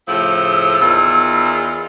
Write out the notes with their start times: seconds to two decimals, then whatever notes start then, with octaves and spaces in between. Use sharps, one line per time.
0.08 A2 C#3 F3 E6
0.81 E2 D#3 F4